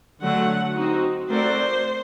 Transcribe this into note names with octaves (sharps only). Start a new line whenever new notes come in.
D3 F#3 A3 F#5
C4 D#4 F#4
A3 C4 F#4 A#4 C5 D5